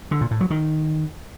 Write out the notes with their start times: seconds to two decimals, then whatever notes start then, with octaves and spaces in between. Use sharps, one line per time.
0.11 D3
0.21 A#2
0.31 A2
0.41 F#3
0.50 D#3